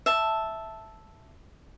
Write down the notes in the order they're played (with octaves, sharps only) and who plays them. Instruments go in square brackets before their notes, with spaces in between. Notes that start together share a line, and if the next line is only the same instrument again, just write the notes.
[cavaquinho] E5 A5